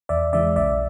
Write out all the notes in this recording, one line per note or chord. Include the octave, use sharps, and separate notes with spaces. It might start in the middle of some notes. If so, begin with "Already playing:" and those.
E2 D5 E5
C#3 E3 G#3 D5 E5
B1 D5 E5